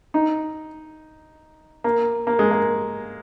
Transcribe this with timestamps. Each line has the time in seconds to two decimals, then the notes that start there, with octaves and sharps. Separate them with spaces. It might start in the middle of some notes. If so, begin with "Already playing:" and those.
0.14 D#4
1.84 A#3
2.27 A#3
2.39 G#3
2.51 A#3